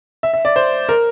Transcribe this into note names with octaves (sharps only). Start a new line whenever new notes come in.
E5
E5
D5
C5
A#4